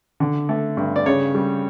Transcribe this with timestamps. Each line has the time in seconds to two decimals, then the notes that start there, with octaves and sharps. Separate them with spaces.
0.20 D3
0.49 A3
0.77 G2
0.96 D5
1.06 C#3 C#5
1.35 G3